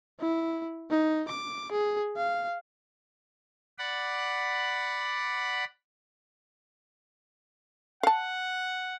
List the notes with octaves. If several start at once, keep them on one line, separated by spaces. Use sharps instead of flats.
E4
D#4
D6
G#4
F5
D5 F#5 B5
F5 F#5 A5